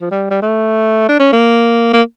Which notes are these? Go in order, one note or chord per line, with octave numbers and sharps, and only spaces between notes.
F3
G3
G3
A3
D4
C#4
A#3
A#3